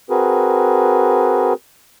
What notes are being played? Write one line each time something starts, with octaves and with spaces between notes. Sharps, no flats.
C4 F#4 G#4 A#4 B4